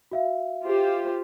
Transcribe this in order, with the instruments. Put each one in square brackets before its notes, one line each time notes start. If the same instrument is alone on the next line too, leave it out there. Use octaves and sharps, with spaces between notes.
[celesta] F#4 E5 F5
[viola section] F4 G4 C5